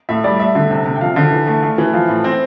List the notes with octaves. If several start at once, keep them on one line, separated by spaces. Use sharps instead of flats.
A2 E5
G3 D5
A3 E5
D3
C3
C3
G5
F3 F5
D3
E3
A3
A3
E3
F3 F5
A2
C4